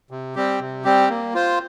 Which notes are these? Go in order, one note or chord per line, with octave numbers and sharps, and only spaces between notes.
C3
G3 C4 G4
C3
G3 C4 G4
A#3
F4 C5